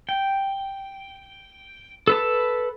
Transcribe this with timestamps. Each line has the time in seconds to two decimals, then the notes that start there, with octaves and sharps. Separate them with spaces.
0.09 G5
2.07 A4 B4 A5